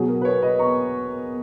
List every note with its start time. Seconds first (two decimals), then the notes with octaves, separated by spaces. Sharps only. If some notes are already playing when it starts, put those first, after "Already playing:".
Already playing: B2 F#3 G#4
0.08 A#4
0.21 B4
0.25 A#4 C#5
0.42 B4 D#5
0.59 A#5 C#6